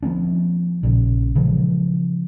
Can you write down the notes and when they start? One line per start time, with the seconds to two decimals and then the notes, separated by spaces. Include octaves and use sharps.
0.03 F3 A#3 C4 D4
0.83 A#1 A#2 C#3
1.35 C#3 E3 F3 G#3